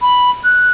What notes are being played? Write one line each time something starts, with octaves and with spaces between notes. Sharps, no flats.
B5
F#6